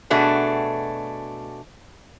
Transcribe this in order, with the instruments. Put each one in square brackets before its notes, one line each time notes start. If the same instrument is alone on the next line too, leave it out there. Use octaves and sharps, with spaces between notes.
[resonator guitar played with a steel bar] B2 A3 D4 F#4 G#4